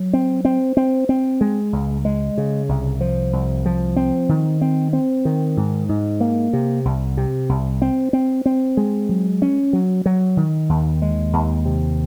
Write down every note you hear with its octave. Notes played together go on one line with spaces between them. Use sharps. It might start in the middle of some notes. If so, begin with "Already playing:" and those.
Already playing: F#3
C4
C4
C4
C4
G#3
C#2
G#3
C#3
C2
F3
C2
F3
C4
D#3
C4
C4
D#3
G#2
G#2
A#3
C3
C2
C3
C2
C4
C4
C4
G#3
F#3
C#4
F#3
F#3
D#3
D#2
G#3
D#2
C3